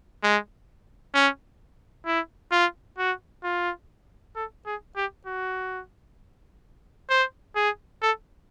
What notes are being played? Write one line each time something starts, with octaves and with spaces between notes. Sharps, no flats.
G#3
C#4
E4
F4
F#4
F4
A4
G#4
G4
F#4
C5
G#4
A4